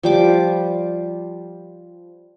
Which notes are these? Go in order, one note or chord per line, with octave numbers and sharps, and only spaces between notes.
F3 G3 D6